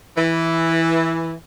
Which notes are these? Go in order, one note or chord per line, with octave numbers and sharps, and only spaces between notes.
E3